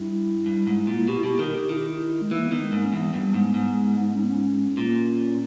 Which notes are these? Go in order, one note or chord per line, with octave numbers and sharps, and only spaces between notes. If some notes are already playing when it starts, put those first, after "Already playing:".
Already playing: G2 E4
G2
G#2
A#2
E4
B2 G4
E4
B2 G4
D#3 A#4
G4
D#3 E4
G4
E4
G#3
E3 A#3
B3
D#3
G#3
G#2 A#3
C#4
E2 B3
G2
G#2
G#2
C#4
B3
C#4
A#2